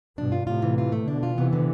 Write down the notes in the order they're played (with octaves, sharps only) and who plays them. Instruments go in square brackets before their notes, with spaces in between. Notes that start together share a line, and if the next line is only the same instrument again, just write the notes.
[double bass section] G2 B2 [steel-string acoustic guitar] D4
[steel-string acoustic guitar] F4
[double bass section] A2 C3 [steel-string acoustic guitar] F4
[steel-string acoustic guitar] E3
F4
A3
[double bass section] B2 D3 [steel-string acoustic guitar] D4
[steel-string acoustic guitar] F4
[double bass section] C3 E3 [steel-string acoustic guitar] B3
[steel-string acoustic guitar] D3